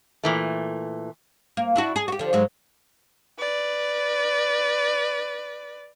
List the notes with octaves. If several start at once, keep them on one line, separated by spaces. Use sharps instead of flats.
A#2 E3 A3
A#3
D4 E4 F#4
G#4
F#4 G4
D3 F3
G#2 F#3 G#3
B4 D5